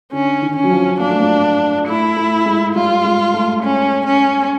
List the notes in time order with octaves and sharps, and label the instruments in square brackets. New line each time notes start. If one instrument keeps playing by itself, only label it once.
[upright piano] D3 [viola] C#4
[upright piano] D#3
[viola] C#4
[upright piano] F#3
F3
[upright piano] A#3 [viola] D4
[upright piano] A3
A#3
[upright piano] A3 [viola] E4
[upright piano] A3
G#3
[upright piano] G3 [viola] F4
[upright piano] G#3
A3
[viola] C#4
C#4